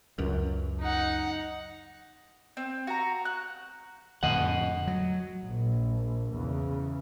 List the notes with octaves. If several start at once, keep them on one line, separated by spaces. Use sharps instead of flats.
C#2 F#2
D#4 F#5
C4
F#4 A#5
F#6
F2 A2 D3 D#5 F#5
F#3
A#1
E2 C#3